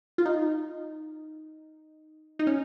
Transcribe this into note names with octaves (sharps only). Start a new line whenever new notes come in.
F4
D#4
D#4
C#4